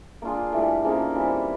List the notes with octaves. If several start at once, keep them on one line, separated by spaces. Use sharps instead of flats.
A#3 D4 F4 G#4
A2 E3 G3
C#3 F3 A#3 D#4
E3 G3 C4 E4